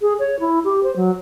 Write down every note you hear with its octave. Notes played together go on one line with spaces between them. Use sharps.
G#4
C#5
E4
G4
C5
F#3